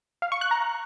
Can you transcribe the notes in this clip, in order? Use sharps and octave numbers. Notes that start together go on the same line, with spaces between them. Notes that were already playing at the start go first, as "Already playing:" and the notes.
F5
C#6
F#6
A#5